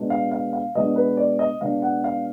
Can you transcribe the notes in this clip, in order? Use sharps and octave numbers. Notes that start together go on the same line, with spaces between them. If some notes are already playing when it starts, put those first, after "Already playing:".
Already playing: B2 G#3 D4
F5
F5
F5
B2 G#3 D4 D#5
B4
D5
D#5
B2 G#3 D4 F5
F#5
F5